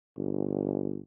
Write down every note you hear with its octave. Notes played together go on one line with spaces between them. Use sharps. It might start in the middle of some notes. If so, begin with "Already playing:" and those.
G1